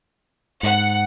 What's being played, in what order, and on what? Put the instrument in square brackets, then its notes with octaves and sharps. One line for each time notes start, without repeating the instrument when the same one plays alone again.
[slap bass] G#2 [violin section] F#5